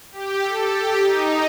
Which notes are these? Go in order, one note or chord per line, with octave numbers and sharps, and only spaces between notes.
G4
A4
G4
D#4